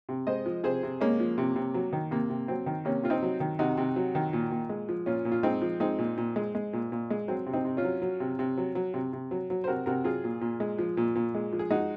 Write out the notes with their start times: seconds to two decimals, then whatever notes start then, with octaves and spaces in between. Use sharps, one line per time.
0.09 C3
0.27 G#3 C5 D#5
0.46 F3
0.63 C3 G#4 C5
0.83 C3
1.01 G#3 A#3 C#4
1.20 F3
1.38 C3
1.56 C3
1.74 F#3
1.93 D#3
2.11 C3 A#3
2.29 C3
2.48 F#3 C4
2.66 D#3
2.85 C3 A#3 C#4
3.03 C3 F4
3.10 C4 D#4
3.23 F#3
3.40 D#3
3.59 C3 D#4 F#4
3.77 C3
3.96 F#3
4.15 D#3
4.33 A#2
4.51 A#2
4.69 G#3
4.89 F3
5.06 A#2 C#4 F4
5.25 A#2
5.32 F4
5.43 G#3 C4 D#4
5.62 F3
5.80 G#3 C4 D#4
5.98 A#2
6.17 A#2
6.36 G#3
6.55 G#3
6.73 A#2
6.92 A#2
7.10 G#3
7.28 F#3 C4
7.46 C3
7.53 C4 D#4
7.65 C3
7.77 C#4 F4
7.84 F#3
8.02 F#3
8.20 C3
8.39 C3
8.58 F#3
8.75 F#3
8.94 C3
9.13 C3
9.31 F#3
9.50 F#3
9.64 C5
9.68 C3 F#4 A#4
9.86 C3 F#4 A#4
10.04 F#3 F4 G#4
10.24 A#2
10.41 A#2
10.60 G#3
10.78 F3
10.97 A#2
11.15 A#2
11.35 G#3
11.53 F3
11.59 G#4
11.70 G#3 D#4 F#4